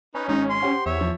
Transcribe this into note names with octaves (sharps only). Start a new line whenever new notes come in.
C#4 D#4 B4
G#1 G#2 D#4
C6
G4 C5 F#5
E2 C#5 E5
F3